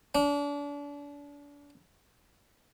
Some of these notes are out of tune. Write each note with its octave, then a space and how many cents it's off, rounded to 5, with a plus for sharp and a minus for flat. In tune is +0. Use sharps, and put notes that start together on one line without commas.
D4 -35